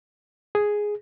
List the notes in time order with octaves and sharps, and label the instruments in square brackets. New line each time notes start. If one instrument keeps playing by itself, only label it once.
[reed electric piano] G#4